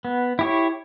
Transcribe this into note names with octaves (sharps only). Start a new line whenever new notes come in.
B3
E4 G4 C#5